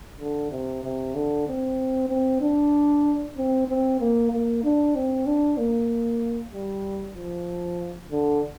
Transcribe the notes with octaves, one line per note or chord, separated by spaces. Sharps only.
D3
C3
C3
D3
C4
C4
D4
C4
C4
A#3
A#3
D4
C4
D4
A#3
G3
F3
D3